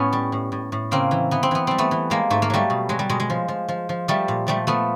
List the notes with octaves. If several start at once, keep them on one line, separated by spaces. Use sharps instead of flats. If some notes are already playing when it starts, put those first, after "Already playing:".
Already playing: A2 B3 C#4
G3
A2
A2
A2
C#3 A#3 C4
E3
E3 B3
C4
E3 B3
G3 C4
A3 B3
E3
G3 G#3 A#3
G#2 A3
A#3
F#3 G3 A3
B2
F#3 G#3
G3
B2 G#3
G#3
F3
F3
F3
F3
F3 G3 A3
A#2
F3 G3 A3
F3 A3 B3